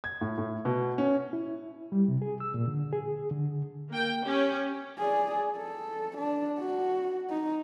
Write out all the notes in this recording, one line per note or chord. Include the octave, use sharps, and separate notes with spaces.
G#6
A2
A2
B2
C#4
E4
G3
C3
G#4
E6
A#2
D3
G#4
D3
A#3 G5
C#4 G4
G#4 D5
A4
D4
F#4
D#4